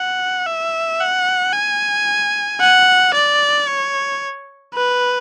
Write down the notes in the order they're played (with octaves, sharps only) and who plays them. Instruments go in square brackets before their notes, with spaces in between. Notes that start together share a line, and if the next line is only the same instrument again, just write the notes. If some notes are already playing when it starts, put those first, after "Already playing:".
Already playing: [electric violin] F#5
E5
F#5
G#5
F#5
D5
C#5
B4